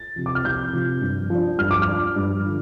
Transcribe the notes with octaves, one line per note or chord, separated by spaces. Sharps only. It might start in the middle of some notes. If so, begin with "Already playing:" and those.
Already playing: A6
C3 F3
D6
F6
C2 G6
C3 F3
G2
F3 D4
G2 F6
D6
F6
F3 D4
G2
D3 F3